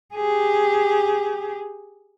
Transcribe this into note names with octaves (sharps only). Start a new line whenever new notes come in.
G4 G#4